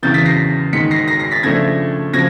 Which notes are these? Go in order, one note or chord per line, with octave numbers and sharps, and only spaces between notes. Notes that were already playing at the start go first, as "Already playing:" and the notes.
E2 C#3 E3 G6 A6
A6 B6
A#6 C7
G#2 D#3 G#3 B6 C#7
A#6 C7
A#6 C7
A#6 C7
A6 B6
C#3 F3 A3 D4 G#6 A#6
C#3 F3 G#6 A#6